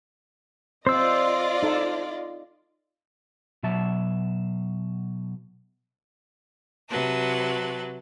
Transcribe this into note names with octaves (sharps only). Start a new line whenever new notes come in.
C4 F4 C5 D5 D#5 E6
D#4 A4
B2 F#3 E5 A5
C3 F#3 B4 A5